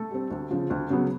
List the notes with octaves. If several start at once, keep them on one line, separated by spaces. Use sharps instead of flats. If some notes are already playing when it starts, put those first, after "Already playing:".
Already playing: A3 A4
G3 C4
D2
C#3 F3
D2
C#3 F#3 B3